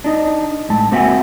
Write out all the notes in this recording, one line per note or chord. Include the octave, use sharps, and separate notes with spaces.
D4 D#4 D#5
A2 G#3 A5
A#3 C4 F#4 E5 F#5 G#5